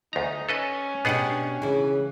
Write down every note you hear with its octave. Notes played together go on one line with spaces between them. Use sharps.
D2 D#4 A#5
C#4 A4 B4 D#5
B2 B3 D4 G4 G#4 F#5
C#3 E3 E4